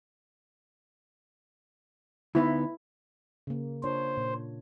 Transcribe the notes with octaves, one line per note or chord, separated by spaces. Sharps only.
D2 B3 D#4 E4
C#3 A#3
D4 F4 C5 C#5
A#2